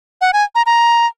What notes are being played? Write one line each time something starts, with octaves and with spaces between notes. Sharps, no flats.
F#5
G#5
A#5
A#5